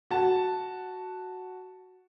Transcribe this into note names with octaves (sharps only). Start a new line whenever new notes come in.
F#4 A5